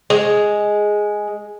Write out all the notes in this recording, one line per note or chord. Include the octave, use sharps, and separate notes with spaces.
G#3